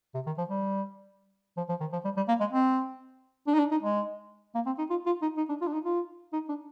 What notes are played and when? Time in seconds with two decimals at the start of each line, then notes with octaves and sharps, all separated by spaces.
0.14 C3
0.26 D#3
0.38 F3
0.50 G3
1.57 F3
1.69 F3
1.80 D#3
1.92 F3
2.04 G3
2.17 G3
2.28 A#3
2.40 G#3
2.52 C4
3.47 D4
3.54 D#4
3.59 D4
3.71 D#4
3.83 G#3
4.55 A#3
4.66 C4
4.78 D#4
4.90 F4
5.06 F4
5.22 D#4
5.37 D#4
5.49 D4
5.61 F4
5.67 D4
5.73 D#4
5.85 F4
6.33 D#4
6.49 D4